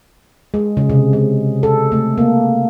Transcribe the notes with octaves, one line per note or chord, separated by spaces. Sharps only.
G#3
C#3
C3
G#3
A4
A3
A#3